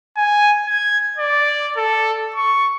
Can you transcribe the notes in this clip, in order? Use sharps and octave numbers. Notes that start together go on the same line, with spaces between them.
G#5
G#6
D5
A4
C#6